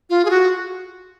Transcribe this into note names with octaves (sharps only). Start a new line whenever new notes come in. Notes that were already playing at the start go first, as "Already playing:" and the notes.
F4
G#4
F#4